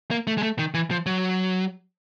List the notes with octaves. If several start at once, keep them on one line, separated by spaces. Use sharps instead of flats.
A#3
A3
G#3
A3
D#3
E3
F3
F#3